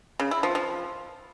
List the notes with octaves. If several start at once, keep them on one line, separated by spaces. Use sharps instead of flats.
C#3
E4
F3
F3